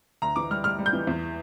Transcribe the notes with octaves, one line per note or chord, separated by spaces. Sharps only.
D2 A#5
E3 D6
G3 F6
G3 F6
G3
G6
E3
E2